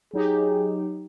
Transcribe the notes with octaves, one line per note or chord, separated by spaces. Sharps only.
F#3 D#4 G4 G#4